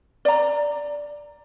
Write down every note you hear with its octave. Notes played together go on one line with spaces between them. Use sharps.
D5 A#5